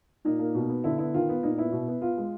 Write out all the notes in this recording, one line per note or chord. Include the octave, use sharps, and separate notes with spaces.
A#2 D#4
A#3
B2
B3
D3 E4
B3 E4
D#3 F4
B3
A#2 D#4
B3 E4
B2
B3
B3 F4
G#3